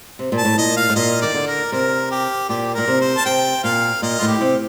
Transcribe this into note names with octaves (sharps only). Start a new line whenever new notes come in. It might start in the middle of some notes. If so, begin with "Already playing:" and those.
C3
A#2
A5
A2
A#2 D#5
F5
A2
A#2 D#5
D#3 D5
D3
A#4
C3 A#4
G4
A#2 G4
A#2 A#4
C3
C5
A5
C3 G5
A#2 F5
A#2 D#5
A2 F4
G4
C3